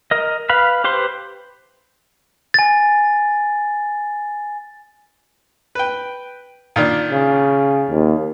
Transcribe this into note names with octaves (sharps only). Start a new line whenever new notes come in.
A#4 D#5
B4 F5 B5
G4 B4 C5 C6
G#5 A6
B4 G5
A#2 D#3 D4
C#3
D#2